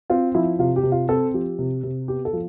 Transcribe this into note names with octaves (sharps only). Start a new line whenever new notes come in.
C4 F4
F3 E4
C3 F4
G4
C3
F4
C4 A4
F3 G4
C3
C3
B3 G4
A4
F3